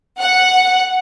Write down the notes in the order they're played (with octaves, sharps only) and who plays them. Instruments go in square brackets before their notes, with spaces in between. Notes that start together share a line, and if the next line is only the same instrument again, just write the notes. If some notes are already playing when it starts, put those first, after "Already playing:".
[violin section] F#5